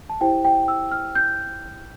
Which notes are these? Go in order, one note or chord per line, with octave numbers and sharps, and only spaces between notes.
A5
E4 G4 C5 G5
G5
E6
F6
G6